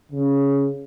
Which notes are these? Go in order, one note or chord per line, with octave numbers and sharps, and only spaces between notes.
C#3